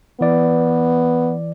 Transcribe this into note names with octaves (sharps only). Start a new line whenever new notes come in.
E3 B3 D5